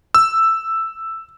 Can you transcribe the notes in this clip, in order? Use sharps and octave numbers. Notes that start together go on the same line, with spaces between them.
E6